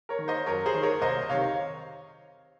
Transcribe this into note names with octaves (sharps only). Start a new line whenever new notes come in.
A#4 C#5
D#3
C5 D#5
F#2 A#4 C#5
G#4 C5
D#3
A#4 C#5
C2 C5 D#5
C3 D#3 C#5 F5